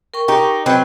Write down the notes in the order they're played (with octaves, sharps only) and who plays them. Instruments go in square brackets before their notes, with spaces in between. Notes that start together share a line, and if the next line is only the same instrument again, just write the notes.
[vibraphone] A#4 G5 C#6
[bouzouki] D#4 G4
[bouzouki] F#3 C4 [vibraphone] B4 D#5 B5